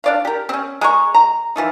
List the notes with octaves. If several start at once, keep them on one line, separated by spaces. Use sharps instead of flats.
D4 D5 F5
G4 A#4
C4 C#4
G#3 A#5 C#6
A#5
E3 F3 D#4